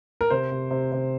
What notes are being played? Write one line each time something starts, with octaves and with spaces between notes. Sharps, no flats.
A#4
C3 C5
C3
C3
C3